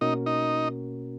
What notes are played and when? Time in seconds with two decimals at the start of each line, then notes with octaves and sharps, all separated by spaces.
0.01 B2 A#3 C#4 D#4 F#4 A#4
0.26 D#4